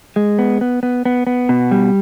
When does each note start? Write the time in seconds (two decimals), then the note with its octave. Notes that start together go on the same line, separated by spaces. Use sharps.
0.16 G#3
0.39 B3
0.61 B3
0.83 B3
1.05 B3
1.27 B3
1.49 B2
1.71 G3